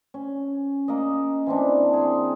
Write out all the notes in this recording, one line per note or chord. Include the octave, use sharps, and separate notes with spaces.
C#4
A#3 D#5
E3 C4 D4
G#4 C6